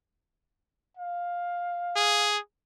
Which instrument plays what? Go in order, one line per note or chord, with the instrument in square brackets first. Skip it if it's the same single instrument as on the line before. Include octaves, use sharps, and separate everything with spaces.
[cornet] F5
[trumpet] G#4